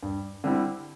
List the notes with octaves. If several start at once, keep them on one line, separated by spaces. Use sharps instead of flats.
G2
D3 G3 C4 E4